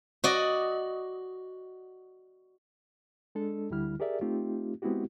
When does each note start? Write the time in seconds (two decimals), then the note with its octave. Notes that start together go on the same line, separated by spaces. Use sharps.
0.24 F#4 D5 D#5
3.35 G#3 D4 A4
3.71 D2 D3 G3 E4 F6
4.00 G4 G#4 A#4 D5 E5
4.21 A3 C4 D#4 F4 G4
4.82 G#3 B3 C4 E4 F#4 G4